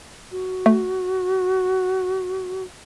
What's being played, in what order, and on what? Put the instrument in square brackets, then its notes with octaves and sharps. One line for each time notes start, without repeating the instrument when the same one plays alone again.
[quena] F#4
[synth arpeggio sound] A3